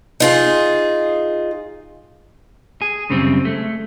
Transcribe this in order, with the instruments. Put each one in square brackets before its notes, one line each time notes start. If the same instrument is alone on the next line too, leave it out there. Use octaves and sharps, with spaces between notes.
[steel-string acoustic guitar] D#4 F4 G#4
[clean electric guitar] G#4
F#2 C#3 G3 C4
G#3 A3